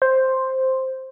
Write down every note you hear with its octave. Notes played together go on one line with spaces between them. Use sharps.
C5